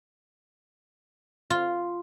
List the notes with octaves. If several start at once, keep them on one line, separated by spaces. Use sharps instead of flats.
F4